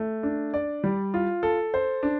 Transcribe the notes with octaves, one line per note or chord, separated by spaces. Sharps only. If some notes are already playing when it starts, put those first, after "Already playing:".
Already playing: A3
D4
D5
G3
F4
A4
C5
D4